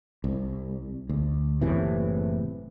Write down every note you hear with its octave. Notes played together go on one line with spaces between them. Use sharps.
C2
D2
F#1 A2 C3 E3